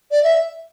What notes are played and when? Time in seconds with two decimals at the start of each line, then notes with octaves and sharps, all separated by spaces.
0.11 D5
0.24 E5